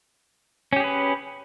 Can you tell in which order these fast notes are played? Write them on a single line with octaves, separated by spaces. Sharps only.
C#4 G4 G#4 B4